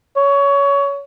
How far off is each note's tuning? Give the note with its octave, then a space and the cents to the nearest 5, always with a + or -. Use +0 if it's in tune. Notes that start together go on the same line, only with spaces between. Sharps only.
C#5 +20